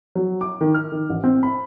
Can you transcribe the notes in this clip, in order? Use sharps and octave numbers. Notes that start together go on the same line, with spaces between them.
F#3
D6
D#3
F6
D#3
A1
C4
B5